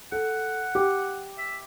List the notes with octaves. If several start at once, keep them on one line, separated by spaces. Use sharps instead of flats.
A4 F#5
G4
E5